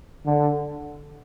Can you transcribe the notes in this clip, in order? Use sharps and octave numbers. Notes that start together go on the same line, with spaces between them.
D3